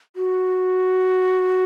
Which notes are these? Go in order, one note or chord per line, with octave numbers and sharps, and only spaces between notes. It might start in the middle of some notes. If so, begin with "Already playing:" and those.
F#4